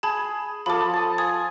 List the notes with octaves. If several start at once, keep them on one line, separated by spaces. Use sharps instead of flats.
G#4 A5 B5 G#6
F3 F4 A4 B5 D6
A5 D#6
G#5 D#6